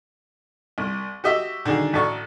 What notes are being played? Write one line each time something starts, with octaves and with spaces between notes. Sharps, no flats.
C2
F#4 G4 D#5 E5
D3 D#3 D4 F#4 G#4
A1 F#4 A4 D5 C#6